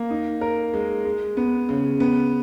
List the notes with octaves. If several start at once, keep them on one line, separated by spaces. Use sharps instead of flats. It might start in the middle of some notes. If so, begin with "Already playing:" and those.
Already playing: A#3
D#4
A#4
G#3
G#3
B3
C#3
B3